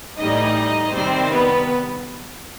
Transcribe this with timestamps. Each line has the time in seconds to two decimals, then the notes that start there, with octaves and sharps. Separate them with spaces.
0.18 A2 E3 G3 D#4 D#5
0.93 C3 D#3 G3 C4 C5
1.31 B3 B4